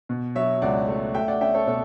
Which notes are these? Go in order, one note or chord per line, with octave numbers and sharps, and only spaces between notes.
B2
F#3 C#5 E5
C#2 D5 F#5
A3
A3 E5 G5
D5 F#5
C#4 E5 G5
A4 C#5
B2 A4 C#5